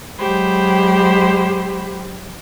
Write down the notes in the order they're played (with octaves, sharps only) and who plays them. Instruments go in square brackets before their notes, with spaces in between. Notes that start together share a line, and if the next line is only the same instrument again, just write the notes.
[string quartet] F#3 G#3 G4 C5 B5